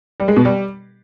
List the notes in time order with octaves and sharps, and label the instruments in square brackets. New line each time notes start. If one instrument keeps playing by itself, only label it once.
[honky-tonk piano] G3
G#3
B2
G3